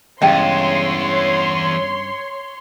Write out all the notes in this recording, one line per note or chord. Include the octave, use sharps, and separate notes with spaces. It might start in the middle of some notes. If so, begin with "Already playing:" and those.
E2 G2 C#3 G#3 C#5 D#5 G5 C6